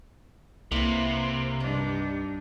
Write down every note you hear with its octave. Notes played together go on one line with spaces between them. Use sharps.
C2 C3 A#3 E4 B4
G2 D4 D#4